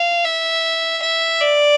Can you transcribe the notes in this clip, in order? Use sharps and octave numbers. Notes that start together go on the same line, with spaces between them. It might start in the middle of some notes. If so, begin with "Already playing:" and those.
Already playing: F5
E5
E5
D5